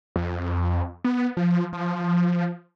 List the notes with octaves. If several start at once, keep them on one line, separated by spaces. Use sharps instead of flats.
F2
B3
F3
F3